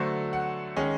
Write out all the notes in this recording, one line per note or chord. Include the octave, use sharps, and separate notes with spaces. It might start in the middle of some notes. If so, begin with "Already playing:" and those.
Already playing: D3 F#3 A3 C5
F#5
D#3 G#3 C#4